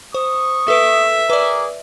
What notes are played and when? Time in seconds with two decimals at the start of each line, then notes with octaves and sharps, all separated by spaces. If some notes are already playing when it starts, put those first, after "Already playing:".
0.14 C5 C#6 D#6
0.68 A4 B4 E5 D7
1.30 G#4 A#4 B4 D5 D6